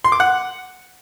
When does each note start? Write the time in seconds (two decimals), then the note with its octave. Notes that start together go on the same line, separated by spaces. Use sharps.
0.04 C6
0.12 D6
0.20 F#5